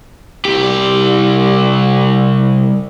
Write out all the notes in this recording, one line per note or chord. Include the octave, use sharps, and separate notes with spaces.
C2 G4